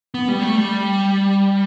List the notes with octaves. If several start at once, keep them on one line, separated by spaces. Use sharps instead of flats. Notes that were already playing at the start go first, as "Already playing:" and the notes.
B3
G3
A3
G3